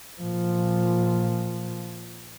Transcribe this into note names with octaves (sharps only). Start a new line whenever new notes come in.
A#2 F3